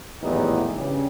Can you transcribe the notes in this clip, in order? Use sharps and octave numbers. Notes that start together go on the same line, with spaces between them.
G#1 E2 A2 F#3 D#4 G4
G2 C#3 G4